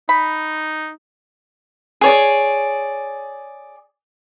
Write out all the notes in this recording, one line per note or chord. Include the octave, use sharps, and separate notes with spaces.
D#4 B5
G#4 C#5 D5